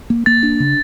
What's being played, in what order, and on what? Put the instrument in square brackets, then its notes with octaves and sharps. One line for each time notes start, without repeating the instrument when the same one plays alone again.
[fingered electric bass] A#3
[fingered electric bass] A#3 [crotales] A6
[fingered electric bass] D4
C#3